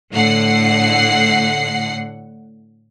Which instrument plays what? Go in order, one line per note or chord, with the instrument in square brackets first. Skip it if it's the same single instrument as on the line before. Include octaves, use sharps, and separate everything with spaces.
[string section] A2 D3 F#5 C7